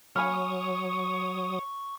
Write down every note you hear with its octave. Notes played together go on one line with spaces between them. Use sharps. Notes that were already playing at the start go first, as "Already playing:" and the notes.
F#3 C#5 G#5 B5 C#6 D#6 F6